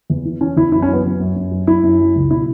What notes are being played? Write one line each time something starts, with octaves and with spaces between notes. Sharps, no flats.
E2
E3
E3 C#4
E2 E4
F#2 E4
C#4
F#3 B3
F#3
F#2
F#2
F#3
F#3 E4
F#2
F#3
C#2
B2 E4